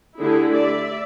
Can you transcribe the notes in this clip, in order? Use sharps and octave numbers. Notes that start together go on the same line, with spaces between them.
D3 A3 E4 G4 G#4
D5 E5